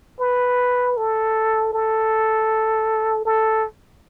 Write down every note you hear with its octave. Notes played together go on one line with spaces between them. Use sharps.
B4
A4
A4
A4